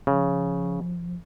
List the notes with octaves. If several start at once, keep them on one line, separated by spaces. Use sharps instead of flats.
C#3 F3